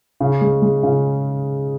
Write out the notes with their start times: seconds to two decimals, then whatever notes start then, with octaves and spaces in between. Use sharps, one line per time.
0.20 C#3
0.41 G#3
0.62 G#3
0.83 C#3